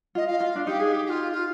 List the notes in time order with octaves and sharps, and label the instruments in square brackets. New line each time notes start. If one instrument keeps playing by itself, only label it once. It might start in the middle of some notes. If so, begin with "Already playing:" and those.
[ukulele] F4 [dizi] D#5
[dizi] F5
[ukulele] F4
D4
[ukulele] D#4 [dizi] G4
[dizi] G#4
G4
G4
F4
F4